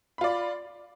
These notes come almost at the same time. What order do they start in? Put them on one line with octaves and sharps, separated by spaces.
B5 F4 D5